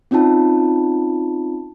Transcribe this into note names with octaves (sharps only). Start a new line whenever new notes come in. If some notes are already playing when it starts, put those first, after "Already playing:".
C4 C#4 D#4 F4 A5